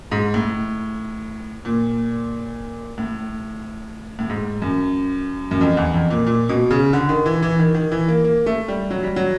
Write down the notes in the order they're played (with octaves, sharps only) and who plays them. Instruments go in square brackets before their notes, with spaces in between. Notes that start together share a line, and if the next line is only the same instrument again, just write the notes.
[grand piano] G#2
A2
A#2
A2
A2
G#2
F#2
F#2
F2
E2
F2
A#2
A#2
B2
C#3
D3
D#3
E3
E3
D#3
D#3
E3
A#3
A#3
A3
G3
F#3
G3
F#3